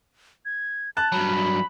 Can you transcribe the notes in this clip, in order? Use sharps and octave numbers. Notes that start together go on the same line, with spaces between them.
G#6
A5 F#6 A6
G2 F#3 B5